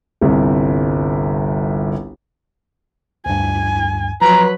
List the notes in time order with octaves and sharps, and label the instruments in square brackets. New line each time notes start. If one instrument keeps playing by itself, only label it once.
[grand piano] G1 C2
[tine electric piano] D2 G2 [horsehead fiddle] G#5
[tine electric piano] F3 C6 [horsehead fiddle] F#3 B4 [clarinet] A#5